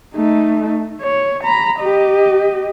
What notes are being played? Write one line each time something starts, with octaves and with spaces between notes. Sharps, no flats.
A3 D#4
C#5
A#5 B5
G4 D#5